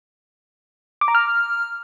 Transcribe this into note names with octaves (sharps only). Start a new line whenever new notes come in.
D6
A#5
F6